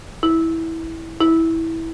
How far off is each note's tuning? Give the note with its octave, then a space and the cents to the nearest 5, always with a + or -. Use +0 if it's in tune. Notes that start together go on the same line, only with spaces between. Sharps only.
E4 -15
E4 -15